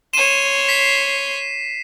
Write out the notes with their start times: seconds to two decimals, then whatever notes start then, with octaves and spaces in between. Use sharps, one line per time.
0.14 C#5 C6 D#7 E7
0.69 B6 C7